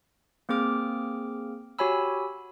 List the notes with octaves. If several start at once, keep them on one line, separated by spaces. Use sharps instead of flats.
A#3 C4 G#4 D6 F6
F#4 G4 C#5 G#5 B5 E6